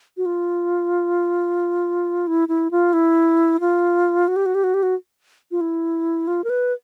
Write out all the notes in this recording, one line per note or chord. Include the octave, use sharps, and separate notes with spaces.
F#4
F4
E4
E4
F4
E4
F4
F#4
G4
F#4
G4
F#4
G4
F#4
F4
E4
F4
A#4
B4